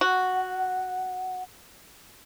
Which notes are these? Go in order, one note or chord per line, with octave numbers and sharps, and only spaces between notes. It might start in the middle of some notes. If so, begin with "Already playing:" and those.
F#4 F#5